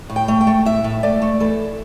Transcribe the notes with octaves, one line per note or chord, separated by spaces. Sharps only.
A2
G5
A3
G5
A3
A2 E5
A2
A3 D5
A3
E3 A4